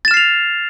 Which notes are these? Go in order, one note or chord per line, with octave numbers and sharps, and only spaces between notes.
F6 A6 C7 E7 F7